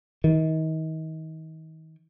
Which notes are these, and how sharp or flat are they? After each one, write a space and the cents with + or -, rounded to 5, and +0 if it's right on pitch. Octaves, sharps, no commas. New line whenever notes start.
D#3 +35